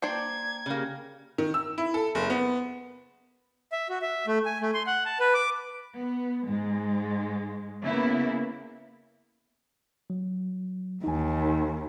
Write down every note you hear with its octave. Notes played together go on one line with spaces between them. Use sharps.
A#3 D4 C5 D5 G5 G#6
C#3 A#3 G4 G#4
D#3
E6
E4
A4
F#1
B3
E5
F#4
E5
A3
G#5
A3
C6
F#5
A5
B4
D6
B3
G#2 G#3
C#3 A#3 B3 E4
F#3
D#2 D#4 G#5